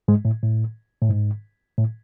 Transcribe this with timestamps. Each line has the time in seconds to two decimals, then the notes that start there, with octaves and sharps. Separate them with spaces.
0.08 G#2 G#3
0.25 A2
0.43 A2
1.01 A2
1.09 G#2
1.78 A2